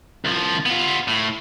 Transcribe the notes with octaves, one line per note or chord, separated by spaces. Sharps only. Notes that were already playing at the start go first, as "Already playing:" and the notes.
C2 F3
B3 F4
A2